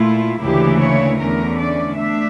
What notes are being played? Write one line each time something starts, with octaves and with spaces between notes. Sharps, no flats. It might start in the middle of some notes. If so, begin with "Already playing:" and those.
Already playing: A#2 A3 E4 F4
D2 C#3 E3 A#3 E4 G4
C#5
E2 D3 A3 C#4 A#4
D5
D3 A3 D4 E5